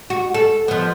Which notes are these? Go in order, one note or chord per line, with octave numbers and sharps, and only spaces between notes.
F#4
A4
F3 B3